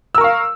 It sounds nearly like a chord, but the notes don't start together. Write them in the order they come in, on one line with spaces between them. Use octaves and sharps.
E6 A#4 C#6 F5